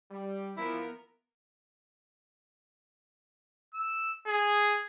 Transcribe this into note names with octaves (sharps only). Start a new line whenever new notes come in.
G3
E3 F3 B3 E4 A#4
E6
G#4